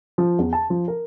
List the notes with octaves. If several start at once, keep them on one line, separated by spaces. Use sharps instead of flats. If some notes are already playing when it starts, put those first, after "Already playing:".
F3
E2
A5
F3
A#4